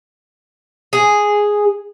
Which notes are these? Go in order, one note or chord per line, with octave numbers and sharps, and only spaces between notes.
G#4